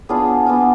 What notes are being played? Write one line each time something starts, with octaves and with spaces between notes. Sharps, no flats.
B3 D4 F4 G#4
B3 D4 F4